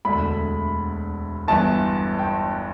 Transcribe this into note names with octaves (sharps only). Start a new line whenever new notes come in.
E1 D2 D3 A3 B5
G1 G2 E3 B3 A5
G5